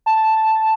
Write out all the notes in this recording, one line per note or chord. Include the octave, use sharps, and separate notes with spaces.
A5